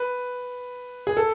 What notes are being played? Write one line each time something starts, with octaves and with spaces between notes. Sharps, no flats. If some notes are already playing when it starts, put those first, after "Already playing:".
Already playing: B4
G#4
A4